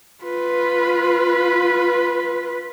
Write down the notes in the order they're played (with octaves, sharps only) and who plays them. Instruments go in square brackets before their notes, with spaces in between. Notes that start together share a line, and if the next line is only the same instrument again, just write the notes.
[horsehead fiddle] F4 B4